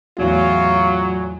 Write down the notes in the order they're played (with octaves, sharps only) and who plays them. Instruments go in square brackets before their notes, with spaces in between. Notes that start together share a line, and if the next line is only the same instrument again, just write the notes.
[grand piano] E2 A2 E3 [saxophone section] F#3 [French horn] F4